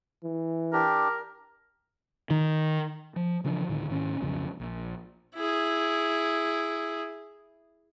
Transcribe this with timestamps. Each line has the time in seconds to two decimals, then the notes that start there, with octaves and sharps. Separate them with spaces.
0.24 E3
0.73 D4 G4 A#4
2.30 D#3
3.16 F3
3.44 C#3 E3 F3 D4
3.69 D1 A2 D3 D#3
3.90 G#2 D#3 C#4
4.21 B1 F2 C#3
4.60 A#1
5.35 E4 G#4